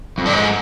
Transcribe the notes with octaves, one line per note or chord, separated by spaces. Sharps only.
F2
G2
G#2